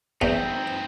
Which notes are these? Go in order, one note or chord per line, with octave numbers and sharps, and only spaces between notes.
E2 C4 D#4